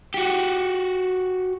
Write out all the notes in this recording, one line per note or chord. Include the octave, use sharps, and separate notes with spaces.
F#4 G4